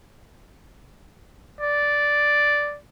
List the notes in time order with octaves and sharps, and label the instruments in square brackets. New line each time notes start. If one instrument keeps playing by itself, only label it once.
[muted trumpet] D5